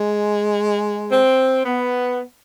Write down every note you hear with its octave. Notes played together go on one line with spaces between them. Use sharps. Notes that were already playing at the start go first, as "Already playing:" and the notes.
Already playing: G#3
C4
B3